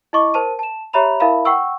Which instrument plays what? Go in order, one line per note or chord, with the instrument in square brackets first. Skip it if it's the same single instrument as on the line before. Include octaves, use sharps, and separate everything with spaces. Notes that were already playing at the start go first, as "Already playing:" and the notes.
[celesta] E4 D#5 C#6 D6
A#4 C5 A5 D#7
A5 E7
G4 C#5 E5 A#5 B5 F7
E4 A#4 E5 F5 B5
F#5 G5 C#6 E6